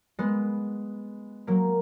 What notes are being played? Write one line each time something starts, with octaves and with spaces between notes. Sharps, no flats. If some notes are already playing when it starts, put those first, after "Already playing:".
G#3 B3
F#3 A#3